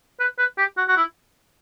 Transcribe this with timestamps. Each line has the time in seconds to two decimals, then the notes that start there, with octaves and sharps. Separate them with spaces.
0.20 B4
0.38 B4
0.58 G4
0.77 F#4
0.88 F#4
0.97 E4